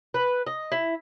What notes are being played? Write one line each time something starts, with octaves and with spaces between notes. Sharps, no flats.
B4
D#5
E4